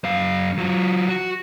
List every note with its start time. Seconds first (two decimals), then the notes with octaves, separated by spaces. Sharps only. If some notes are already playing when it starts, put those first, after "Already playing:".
0.04 F#2 F5
0.58 F#3 F4
1.09 F#4